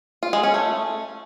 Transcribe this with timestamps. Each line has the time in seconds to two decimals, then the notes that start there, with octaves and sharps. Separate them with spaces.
0.23 F4
0.33 G#3
0.43 C#4
0.54 A3